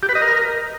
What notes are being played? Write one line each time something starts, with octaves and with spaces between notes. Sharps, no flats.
G4
B4
D#5
A#4